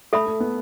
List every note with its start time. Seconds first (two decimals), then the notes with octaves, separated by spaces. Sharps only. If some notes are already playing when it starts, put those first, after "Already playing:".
0.13 A3 A4 E5 B5
0.26 A3
0.40 B3